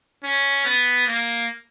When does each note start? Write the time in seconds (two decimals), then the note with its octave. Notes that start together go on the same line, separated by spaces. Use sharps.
0.23 C#4
0.65 B3
1.07 A#3